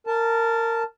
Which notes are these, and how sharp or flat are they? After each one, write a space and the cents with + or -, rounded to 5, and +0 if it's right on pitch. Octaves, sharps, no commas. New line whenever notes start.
A#4 -20 A5 +0